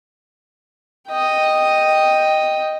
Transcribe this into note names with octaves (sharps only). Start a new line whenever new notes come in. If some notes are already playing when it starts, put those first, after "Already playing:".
D#5 G5